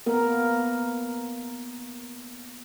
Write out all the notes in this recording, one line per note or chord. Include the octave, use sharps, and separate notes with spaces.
A#3 B3 A#4